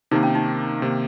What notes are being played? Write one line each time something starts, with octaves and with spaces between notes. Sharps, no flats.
C3 D#3 A#3 D#4
C#4
D#4
C3 D#3 A#3